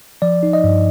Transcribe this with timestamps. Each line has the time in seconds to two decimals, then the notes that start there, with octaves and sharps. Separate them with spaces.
0.22 F3 D5
0.43 D#4
0.53 D#5
0.64 G2